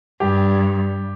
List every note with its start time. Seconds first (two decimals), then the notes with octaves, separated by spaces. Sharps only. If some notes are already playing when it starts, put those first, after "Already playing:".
0.20 G2 G4